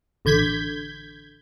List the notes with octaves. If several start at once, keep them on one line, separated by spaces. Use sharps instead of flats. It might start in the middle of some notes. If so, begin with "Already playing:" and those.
A1 D3 G6 G#6 B6